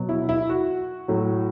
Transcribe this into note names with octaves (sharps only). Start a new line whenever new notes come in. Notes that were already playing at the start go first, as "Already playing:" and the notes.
Already playing: B2 F#3
E4
E4
F#4
A2 F#3